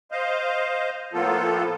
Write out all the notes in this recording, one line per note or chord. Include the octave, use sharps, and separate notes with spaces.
C5 D#5 F5
A2 F3 A#3 B3 F4 A4